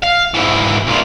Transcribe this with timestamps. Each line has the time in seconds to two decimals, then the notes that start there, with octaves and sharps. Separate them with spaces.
0.03 F5
0.34 G#2 E3
0.87 C2 A#2